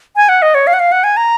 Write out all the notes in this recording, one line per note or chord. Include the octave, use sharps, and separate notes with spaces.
G#5
F#5
D#5
C#5
F5
F#5
F5
F#5
G#5
A#5